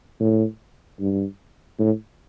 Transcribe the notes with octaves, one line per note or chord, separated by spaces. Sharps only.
A2
G2
A2